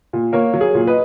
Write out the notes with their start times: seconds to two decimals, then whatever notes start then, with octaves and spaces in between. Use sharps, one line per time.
0.13 A#2
0.33 A#3 A#4 C#5
0.53 F#3
0.61 G#4
0.74 A#2
0.87 B4 D#5